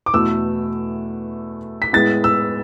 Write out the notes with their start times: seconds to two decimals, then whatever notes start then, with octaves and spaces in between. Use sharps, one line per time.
0.06 D6
0.14 E2 B2 A3 E6
1.82 B6
1.93 A2 G#3 B3 A6
2.24 E6